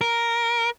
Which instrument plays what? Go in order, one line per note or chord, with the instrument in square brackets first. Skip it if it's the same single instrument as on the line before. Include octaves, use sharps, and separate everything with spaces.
[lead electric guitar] A#4